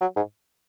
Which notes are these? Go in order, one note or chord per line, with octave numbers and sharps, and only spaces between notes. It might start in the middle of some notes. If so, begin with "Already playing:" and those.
F#3
G#2